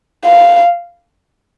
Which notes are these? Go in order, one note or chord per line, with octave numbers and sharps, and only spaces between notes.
F5